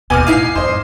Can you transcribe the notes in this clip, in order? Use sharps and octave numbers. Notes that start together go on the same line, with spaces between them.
G#1 D#2 B2 G#5 D6 F6
E1 A2 D#4 E4 F5 C7
G#1 F2 C5 D#5